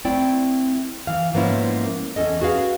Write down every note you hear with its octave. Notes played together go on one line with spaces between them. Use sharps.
A3 C4 E4 D5 G5
E3 F5
G#2 F3 A#3 B3 C#4 E4
E2 C#4 A4 D#5
F#4 G#4 B4 F5